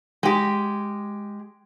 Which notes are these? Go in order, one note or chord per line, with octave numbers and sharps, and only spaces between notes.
G#3 G4